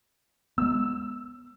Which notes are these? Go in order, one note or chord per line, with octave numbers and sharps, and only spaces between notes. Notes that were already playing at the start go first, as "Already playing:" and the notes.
G#3 B3 E6